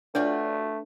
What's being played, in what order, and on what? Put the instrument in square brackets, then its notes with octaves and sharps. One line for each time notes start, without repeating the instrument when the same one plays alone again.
[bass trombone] A3 [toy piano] D4 B4 C#5 [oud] F4 F#4 D5